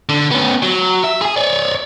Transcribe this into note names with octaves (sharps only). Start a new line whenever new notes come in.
D3
B3 C#4
F#3
E5
G#4 G#5
C#5 D5